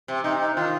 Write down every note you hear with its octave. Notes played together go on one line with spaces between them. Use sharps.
C3
C3 D#4
D#4
D#3 F4